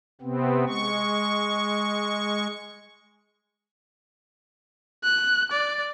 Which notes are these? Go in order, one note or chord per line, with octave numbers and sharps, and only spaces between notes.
C3 B3 C4
G#3 C#6
F#6
D5